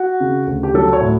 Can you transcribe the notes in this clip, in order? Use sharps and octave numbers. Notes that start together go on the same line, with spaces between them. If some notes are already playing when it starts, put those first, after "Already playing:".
Already playing: F#4
C#3
D2
G4
F#3 A4
C#5
A2